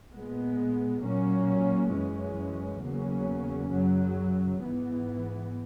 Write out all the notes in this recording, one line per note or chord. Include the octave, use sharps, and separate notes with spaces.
A#2 G#3 B3
A#2 F#3 A#3 C#4
F#2 E3 G#3 C#4
E2 C#3 F#3 A#3 C#4
F#2 C#3 F#3
G#2 E3 B3